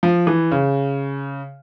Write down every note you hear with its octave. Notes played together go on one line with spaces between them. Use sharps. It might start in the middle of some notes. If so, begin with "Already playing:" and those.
F3
E3
C#3